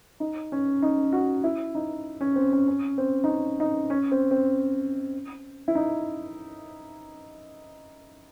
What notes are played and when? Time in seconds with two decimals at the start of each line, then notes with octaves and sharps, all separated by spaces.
0.20 D#4
0.52 C#4
0.82 D#4
1.13 F#4
1.44 E4
1.75 D#4
2.21 C#4
2.36 C4
2.52 C#4
2.68 C#4
2.98 C4
3.24 D#4
3.29 C#4
3.60 D#4
3.90 C#4
4.11 C4
4.31 C4
5.68 E4
5.75 D#4